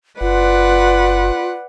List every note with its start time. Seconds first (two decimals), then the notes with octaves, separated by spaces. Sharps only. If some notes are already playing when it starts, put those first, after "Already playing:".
0.21 F#1 F4 B4 D5 F#5